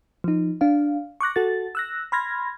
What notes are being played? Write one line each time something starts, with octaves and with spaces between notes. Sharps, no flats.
F3 D#4
D4 F5
C#6 D6 F#6 A#6
F#4 A4 A6
E6 F#6 A#6
B5 C6 F6 G#6 A#6